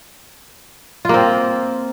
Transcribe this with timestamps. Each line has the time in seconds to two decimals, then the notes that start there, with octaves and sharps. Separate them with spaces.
1.05 F4
1.09 A#3
1.14 C4